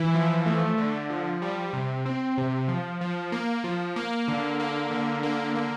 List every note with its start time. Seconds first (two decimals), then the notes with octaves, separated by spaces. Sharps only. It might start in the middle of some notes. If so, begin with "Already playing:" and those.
Already playing: E3 E4
0.15 F3
0.46 A3
0.78 D3
1.10 F3
1.42 G3
1.73 C3
2.06 C4
2.38 C3
2.68 F3
3.01 F3
3.32 A#3
3.64 F3
3.96 A#3
4.28 D3
4.60 A#3
4.91 D3
5.23 A#3
5.55 A#3